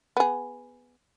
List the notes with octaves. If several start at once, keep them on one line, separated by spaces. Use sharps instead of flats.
B3 G#4